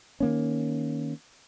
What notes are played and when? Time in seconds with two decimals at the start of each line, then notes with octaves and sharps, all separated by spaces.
0.20 D#3 A#3 C#4